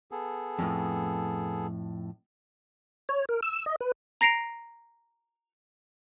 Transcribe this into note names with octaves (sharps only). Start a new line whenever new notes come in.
B3 G#4 A4
F2 A2
C#5
A#4
E6
D#5
B4
A#5 A#6 C7 D7 F7